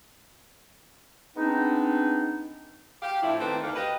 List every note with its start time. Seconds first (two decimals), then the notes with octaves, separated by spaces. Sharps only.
1.37 G#3 B3 C4 D4 D#4
3.02 G4 F5
3.23 A2 F3 D4 E4
3.40 D#3 A3 A#3 C4 D#4 B4
3.63 D2 A#3 F5
3.76 G4 B4 D#5